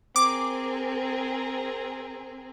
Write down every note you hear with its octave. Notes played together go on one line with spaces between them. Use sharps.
C4 G#4 A#4 D6